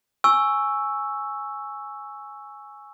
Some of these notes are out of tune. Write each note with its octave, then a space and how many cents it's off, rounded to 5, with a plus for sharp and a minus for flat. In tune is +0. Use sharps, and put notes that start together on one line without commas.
G#5 +0 C#6 +0 E6 +0